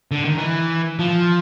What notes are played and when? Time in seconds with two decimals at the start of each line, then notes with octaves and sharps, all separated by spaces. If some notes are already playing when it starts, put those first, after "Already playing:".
0.11 D3
0.25 D#3
0.38 E3
0.99 F3